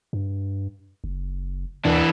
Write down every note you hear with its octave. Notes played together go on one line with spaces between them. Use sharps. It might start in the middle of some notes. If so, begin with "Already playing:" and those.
G2
F#1
D#2 E3 D4